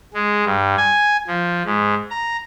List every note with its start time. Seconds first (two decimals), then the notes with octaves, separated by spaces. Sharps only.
0.14 G#3
0.45 G2
0.77 G#5
1.27 F3
1.65 G#2
2.11 A#5